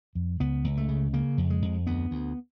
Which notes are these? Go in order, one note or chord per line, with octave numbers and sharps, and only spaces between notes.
F2
C#2 B3
C#2
A3
C#3
C#3 A#3
F2
G#3
F2
D2 B3
D2